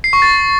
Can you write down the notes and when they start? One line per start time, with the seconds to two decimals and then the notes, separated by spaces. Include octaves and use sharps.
0.04 C7
0.13 C#6
0.22 A6